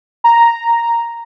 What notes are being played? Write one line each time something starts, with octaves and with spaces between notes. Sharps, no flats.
A#5